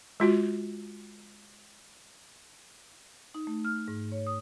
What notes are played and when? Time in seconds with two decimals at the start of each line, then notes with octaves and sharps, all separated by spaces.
0.20 G#3 F4 F#4
3.35 D#4
3.47 A3
3.65 F6
3.88 G#2
4.12 C#5
4.27 D#6